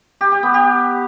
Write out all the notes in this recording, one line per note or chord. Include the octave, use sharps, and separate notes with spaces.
G4
G4
B3
G4